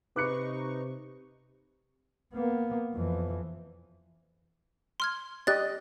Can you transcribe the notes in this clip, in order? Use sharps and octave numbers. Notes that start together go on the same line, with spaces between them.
C3 D#4 B4 C#6 D6 F#6 C#7
A#3 B3
F2 E3
C6 F6 G#6
G4 D5 D#5 F#6 A6